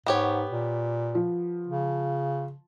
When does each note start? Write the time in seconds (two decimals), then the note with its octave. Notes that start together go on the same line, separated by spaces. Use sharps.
0.06 G#2 B3 G4 C#5
0.51 A#2
1.15 F3
1.67 C#3